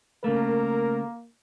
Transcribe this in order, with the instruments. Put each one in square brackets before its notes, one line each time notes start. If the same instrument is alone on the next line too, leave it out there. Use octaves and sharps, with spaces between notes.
[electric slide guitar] C#3 A3 [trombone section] A#3 [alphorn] A#4